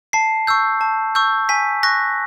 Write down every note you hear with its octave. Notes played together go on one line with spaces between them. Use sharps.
A5 C7
C#6 E6 G6
A5
C#6 E6 G6
G#5 B6
C#6 F#6 A#6